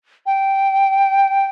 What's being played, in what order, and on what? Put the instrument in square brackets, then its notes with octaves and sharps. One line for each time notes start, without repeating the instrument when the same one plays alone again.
[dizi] G5